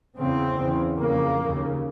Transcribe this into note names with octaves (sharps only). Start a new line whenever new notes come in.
E2 C#3 C4
E2 C#3
F2 C#3 A#3
D#2 C#3